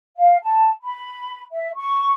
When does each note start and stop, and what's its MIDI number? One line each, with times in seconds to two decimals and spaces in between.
0.18 0.36 77
0.43 0.70 81
0.83 1.41 83
1.52 1.70 76
1.77 2.14 85